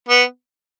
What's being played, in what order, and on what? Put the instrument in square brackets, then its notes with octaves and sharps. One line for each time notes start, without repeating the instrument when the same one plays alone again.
[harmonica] B3